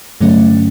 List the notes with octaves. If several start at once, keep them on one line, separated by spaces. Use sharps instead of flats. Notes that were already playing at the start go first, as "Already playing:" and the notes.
G2 D3 F#3 A3 C#4